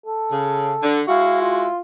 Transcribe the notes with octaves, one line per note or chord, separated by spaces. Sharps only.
A4
C#3
D3
G#3 E4 F#4 F5
F4